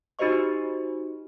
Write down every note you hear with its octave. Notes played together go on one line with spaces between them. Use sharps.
D#4 F#4 G4 C5 D#5 C#6